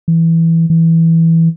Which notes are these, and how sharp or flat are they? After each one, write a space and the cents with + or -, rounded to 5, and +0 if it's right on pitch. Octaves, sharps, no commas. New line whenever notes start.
E3 +0
E3 -5